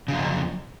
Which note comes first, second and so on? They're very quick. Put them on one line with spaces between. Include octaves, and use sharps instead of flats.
C#3 F#3 F2